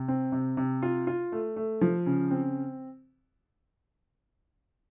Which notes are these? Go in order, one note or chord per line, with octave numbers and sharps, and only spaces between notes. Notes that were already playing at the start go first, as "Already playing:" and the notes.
Already playing: C3
C4
C3
C3
F4
F4
A3
A3
F3
C#3
C4